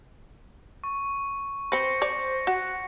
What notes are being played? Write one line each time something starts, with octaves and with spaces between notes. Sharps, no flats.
C#6
C4 B4 C5 A#6 C#7
C#5 D5
F#4 F#5